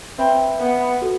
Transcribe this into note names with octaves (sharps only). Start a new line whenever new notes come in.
C4 B4 E5 B5
B3
F#4 A4